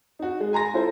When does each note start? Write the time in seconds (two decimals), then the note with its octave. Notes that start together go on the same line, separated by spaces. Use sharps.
0.19 D#4 F#4
0.40 G#3
0.53 G#5 A#5 C6 A#6
0.74 E4 F4 A4 C5